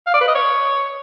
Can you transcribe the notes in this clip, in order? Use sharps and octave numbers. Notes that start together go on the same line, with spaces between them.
F5
D5
B4
D#5
C#5